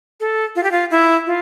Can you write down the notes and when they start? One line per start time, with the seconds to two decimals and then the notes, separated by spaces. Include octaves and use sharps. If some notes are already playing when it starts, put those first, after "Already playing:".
0.20 A4
0.56 F4
0.63 G4
0.72 F4
0.91 E4
1.26 F4